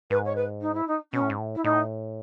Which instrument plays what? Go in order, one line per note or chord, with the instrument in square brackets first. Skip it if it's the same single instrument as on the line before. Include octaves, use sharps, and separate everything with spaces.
[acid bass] G#2 [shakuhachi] B4
[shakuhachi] C#5
B4
D#4
E4
D#4
[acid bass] B2 [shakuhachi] C#4
[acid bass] A2
G#2
A2
[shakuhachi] E4
[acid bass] A2 [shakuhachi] D#4